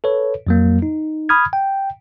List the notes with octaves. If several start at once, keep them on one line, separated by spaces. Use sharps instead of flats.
A4 B4 C#5
F2 F#3 A#3
D#4
B5 D#6 F6 G#6
G5